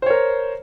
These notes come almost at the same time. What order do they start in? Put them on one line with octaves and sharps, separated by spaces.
C5 C#5 A#4